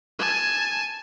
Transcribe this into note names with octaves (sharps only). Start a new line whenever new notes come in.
G#5 A5